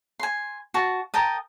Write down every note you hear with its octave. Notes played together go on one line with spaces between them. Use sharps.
G#5 C6
F#4 A5
A#4 G5 A5 D#6